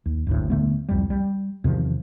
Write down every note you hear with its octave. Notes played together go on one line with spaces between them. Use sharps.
D#2
F#1 D2 A2
D#1 D3 A3 B3
C2 F2 G3
G3
E2 C3 D#3 F3